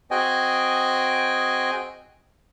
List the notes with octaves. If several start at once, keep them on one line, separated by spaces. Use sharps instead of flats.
C4 F#4 G#4 D#5 G5 G#5